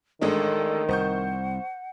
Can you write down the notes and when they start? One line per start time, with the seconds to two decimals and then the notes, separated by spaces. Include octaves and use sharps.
0.21 A1 D#3 G#3 D4 A4
0.89 C2 C5 F#5 C#6 G6